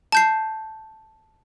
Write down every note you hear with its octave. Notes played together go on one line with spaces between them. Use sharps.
A5 G6 C7